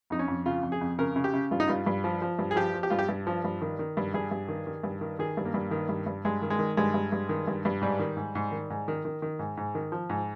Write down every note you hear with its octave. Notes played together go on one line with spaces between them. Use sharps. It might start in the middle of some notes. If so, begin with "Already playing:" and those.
F2 D#4
C#4
F2
C#3 F4
F2
G#4
F2
C#3 A#4
C#3
G4
C#3
G2 F4
D#4
G2 F4
G2
F3
F3
G2
G#4
F3 G4
F3
G4
G2 F4
G4
G2
F3
G2
D#3
D#3
G2
G2 G#4
G2
D#3
D#3
G2
D#3
D#3 G#4
G2
A#3
G2
D#3
G2
G2
G2 G#3
D#3
G#3
D#3
G2 G#3
G2
G2
D#3
G2
G2
G#2 G3
D#3
G#2
G#2
D#3
G#2
D#3
D#3
D#3
G#2
G#2
D#3
F3
G#2